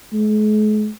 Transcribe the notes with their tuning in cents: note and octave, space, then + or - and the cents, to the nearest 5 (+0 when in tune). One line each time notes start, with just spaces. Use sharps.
G#3 +45